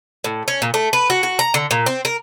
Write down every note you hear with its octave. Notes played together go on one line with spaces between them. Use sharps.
A2
C#4
A#2
A3
B4
F#4
F#4
A#5
D3
A#2
C4
A#4